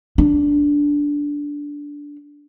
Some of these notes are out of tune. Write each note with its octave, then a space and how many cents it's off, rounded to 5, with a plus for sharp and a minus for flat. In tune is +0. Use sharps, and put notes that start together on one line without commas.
D4 -10